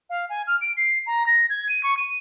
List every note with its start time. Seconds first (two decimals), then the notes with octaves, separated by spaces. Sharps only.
0.10 F5
0.30 G#5
0.47 F6
0.61 D7
0.77 C7
1.07 A#5
1.27 A#6
1.50 G#6
1.69 D#7
1.83 C#6
1.97 D#7